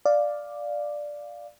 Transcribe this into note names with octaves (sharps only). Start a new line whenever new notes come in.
D5 F5